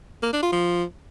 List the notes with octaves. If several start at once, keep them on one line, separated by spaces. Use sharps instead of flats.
A#3
D4
F4
F3